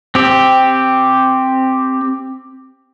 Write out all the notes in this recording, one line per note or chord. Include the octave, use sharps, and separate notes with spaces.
C4 G4